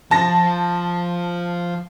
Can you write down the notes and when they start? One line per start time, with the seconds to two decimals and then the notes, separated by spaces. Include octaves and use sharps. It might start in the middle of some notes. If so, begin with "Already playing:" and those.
0.11 F3 F4 A5 A#6